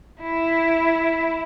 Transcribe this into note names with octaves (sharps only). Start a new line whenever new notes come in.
E4